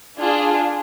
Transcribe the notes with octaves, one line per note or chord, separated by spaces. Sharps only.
D4 F4 G#4